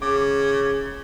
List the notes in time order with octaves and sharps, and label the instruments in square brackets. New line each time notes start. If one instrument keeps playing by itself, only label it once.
[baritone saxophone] C#3 [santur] D6